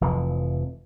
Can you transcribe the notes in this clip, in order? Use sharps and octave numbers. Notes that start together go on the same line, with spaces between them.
F1 F2 E3